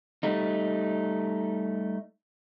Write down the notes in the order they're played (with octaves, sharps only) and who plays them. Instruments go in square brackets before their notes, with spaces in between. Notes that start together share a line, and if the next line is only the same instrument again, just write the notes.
[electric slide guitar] G3 A3 D#4